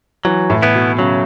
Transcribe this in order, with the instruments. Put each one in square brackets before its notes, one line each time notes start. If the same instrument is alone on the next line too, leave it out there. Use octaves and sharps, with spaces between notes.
[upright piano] E3 [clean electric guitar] F#3
[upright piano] A2
[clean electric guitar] B3 E4
[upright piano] B2
[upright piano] C#3 [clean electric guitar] F#3